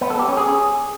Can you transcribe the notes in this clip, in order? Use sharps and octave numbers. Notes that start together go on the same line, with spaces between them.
B3
A4
G4
C#4
G#4